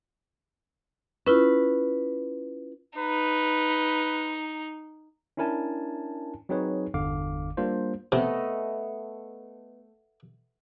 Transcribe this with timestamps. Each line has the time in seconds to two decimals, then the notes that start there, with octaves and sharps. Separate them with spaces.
1.26 C#4 E4 F4 B4
2.99 D#4 B4
5.37 C#4 D4 E4 A#4 G#5 A5
6.49 F#3 C4 D#4 G#4 B4 C#5
6.94 G1 E2 D3 F5 D6
7.57 G3 A#3 D4 F4 C5
8.12 C3 A3 B3 D#5